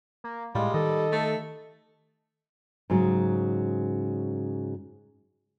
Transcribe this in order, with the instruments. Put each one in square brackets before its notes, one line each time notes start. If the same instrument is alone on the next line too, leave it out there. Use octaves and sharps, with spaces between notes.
[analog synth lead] A#3
[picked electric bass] A2 [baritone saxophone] G3 [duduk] G#3 [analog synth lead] F4
[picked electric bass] D#3 [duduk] A4 [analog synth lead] D#5
[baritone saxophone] A3
[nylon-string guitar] G#2 C#3 F#3